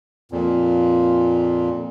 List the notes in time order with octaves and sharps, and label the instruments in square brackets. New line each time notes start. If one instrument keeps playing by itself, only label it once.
[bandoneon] F2 A#2